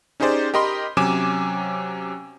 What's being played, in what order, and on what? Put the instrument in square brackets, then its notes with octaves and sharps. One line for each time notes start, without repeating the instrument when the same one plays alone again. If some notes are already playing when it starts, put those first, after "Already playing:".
[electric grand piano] C#4 D#4 G4 G#4 C5 D5
G4 A#4 D#5 B5 C6
C3 F#3 C#4 G#5 D6 E7